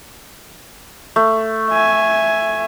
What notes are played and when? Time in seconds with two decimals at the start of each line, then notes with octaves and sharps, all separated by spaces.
1.16 A3
1.69 E5 G#5